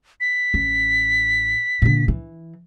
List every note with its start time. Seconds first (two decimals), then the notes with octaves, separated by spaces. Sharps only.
0.21 B6
0.54 A1
1.82 A#2 D3
2.08 E3